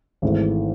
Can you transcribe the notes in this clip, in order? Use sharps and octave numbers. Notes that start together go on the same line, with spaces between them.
G#1 G#2 E3 A3